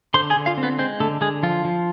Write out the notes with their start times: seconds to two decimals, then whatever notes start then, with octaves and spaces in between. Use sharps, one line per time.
0.14 D3 C5 C6
0.30 G#4 G#5
0.36 D3
0.46 F4 F5
0.58 C4
0.63 B3 B4
0.79 G#3 C4 C5
1.00 D3 A3 A4
1.21 D3 G#3 G#4
1.43 F3 F4
1.65 F3